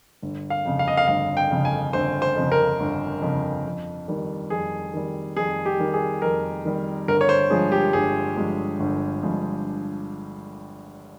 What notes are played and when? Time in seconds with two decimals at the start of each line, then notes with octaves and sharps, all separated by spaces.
0.22 G1
0.50 F5
0.66 F2 C#3
0.79 F5
0.88 D#5
0.97 F5
1.08 G1 F5
1.37 G5
1.51 F2 C#3
1.65 G#5
1.93 G1 C5
2.22 C5
2.36 F2 C#3
2.52 A#4
2.80 G1
3.22 F2 C#3
3.66 F2
4.08 D#3 G3
4.50 F2 G#4
4.93 D#3 G3
5.37 F2 G#4
5.66 G4
5.79 D#3 G3
5.93 G#4
6.22 F2 A#4
6.65 D#3 G3
7.08 G1 A#4
7.21 C#5
7.29 C5
7.50 G2 F3 G#3 G#4
7.72 G4
7.93 G1 G#4
8.36 G2 F3 G#3
8.80 G1
9.23 G2 F3 G#3